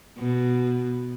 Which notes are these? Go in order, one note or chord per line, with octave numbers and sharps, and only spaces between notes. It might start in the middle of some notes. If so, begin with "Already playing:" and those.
B2